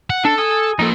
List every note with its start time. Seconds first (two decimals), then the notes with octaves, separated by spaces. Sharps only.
0.10 F#5
0.25 D4 A4
0.38 G#5 D#6
0.79 F3 A#3 D#4 A4